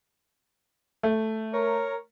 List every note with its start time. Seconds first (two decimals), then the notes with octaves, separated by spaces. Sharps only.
1.03 A3
1.53 A#4 C#5